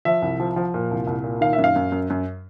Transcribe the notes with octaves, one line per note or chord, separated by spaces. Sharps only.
F3 E5
C2
F3
F3
A#2
C2
C2
A#2
D#3 F5
E5
F#2
F5
F#2
F#2
F#2